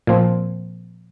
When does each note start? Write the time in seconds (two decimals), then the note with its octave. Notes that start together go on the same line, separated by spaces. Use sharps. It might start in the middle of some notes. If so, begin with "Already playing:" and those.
0.07 A#2 F3 C4